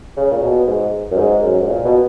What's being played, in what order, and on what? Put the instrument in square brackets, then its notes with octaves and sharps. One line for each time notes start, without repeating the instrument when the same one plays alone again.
[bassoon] C#3
A#2
B2
G#2
F#2
G#2
F#2
G#2
A#2
B2